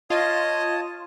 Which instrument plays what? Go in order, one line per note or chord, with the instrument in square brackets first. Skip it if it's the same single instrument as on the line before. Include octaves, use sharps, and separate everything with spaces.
[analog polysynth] F4 [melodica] C#5 A5 D#6 [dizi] D#5